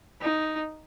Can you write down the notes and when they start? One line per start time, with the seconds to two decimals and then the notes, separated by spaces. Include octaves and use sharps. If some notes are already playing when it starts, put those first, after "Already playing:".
0.21 D#4